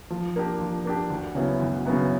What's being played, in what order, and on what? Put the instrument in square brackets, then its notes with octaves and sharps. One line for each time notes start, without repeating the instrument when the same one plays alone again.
[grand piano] F3
A#3 D4 G4
F3
A#3 D4 G4
D2
C#3 F#3 B3 E4
D2
C#3 F#3 B3 E4